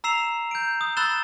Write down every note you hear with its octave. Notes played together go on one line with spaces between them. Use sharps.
A#5 E6 C7 E7 F7
G6 D7
D#6
B5 E6 F#6 A6 E7 G7